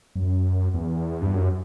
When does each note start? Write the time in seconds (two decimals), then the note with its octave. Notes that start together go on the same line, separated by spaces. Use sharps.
0.15 F#2
0.74 E2
1.22 G2
1.34 F#2